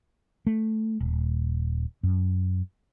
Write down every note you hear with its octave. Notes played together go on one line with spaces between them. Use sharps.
A3
D#1
F#2